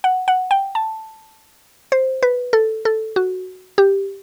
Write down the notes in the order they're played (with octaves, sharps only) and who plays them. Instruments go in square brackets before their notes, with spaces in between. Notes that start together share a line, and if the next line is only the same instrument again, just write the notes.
[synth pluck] F#5
F#5
G5
A5
C5
B4
A4
A4
F#4
G4